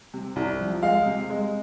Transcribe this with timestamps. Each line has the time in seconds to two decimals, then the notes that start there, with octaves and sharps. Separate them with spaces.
0.14 C3
0.36 C2
0.60 F3
0.83 G#3 F5
1.06 C3
1.30 G#3